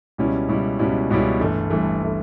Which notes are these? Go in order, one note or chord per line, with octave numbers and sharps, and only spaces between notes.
C#2 B2 G3 C#4 E4
C#2 B2 G3 C#4 E4
C#2 B2 G3 C#4 E4
C#2 B2 G3 C#4 E4
G1 G2 E3 A3
G1 G2 E3 A3
E3 A3